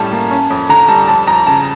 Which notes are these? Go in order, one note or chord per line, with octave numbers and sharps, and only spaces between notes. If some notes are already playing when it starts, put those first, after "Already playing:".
Already playing: A2 G3 C#4 A5
A#3
C#4
F2
D3 A#5
G3 A5
F2 A5
F2 A#5
C#3 A5